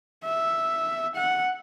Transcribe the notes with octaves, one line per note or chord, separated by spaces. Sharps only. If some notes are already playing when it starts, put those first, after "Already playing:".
E5
F#5